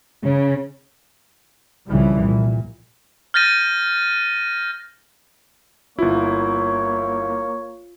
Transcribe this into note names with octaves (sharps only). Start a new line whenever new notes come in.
C#3
C2 C#3 E3 F3 G3
A#2
F6 G6 A6 A#6 D#7
G1 A#3 E4 F4 C#5